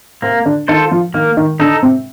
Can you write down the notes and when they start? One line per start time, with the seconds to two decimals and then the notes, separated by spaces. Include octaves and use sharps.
0.22 C3 A#3 C4
0.46 D3 D4
0.68 D#3 D#4 F4 A4 C5
0.91 F3 F4
1.14 D#3 A#3 D#4
1.37 D#3 D#4
1.59 D3 D4 D#4 A4
1.82 C3 C4